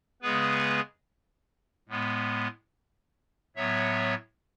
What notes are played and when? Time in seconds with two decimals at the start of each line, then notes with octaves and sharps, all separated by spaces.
0.22 C#3 G#3 B3 G#4 B4
1.89 A2 G#3 B3
3.56 A2 F#3 B3 C#5 E5